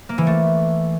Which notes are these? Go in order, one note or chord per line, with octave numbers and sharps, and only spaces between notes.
A#3
E3
A3